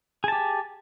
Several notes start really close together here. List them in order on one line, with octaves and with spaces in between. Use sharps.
G#4 A5 G4